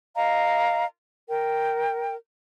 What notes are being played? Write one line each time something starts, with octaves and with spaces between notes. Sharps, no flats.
D#5 F5 A#5
A#4 G5